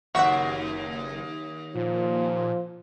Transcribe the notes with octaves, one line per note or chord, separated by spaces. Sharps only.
F#1 D#2 F#4 E5 F#5
A#2 F3